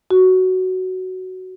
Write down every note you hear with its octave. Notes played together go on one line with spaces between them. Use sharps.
F#4